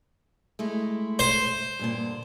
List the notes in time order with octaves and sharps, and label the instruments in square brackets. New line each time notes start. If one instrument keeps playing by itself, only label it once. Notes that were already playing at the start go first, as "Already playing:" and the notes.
[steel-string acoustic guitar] G#3 A3 E4
[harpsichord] C5
[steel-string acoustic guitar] G2 A#2 D3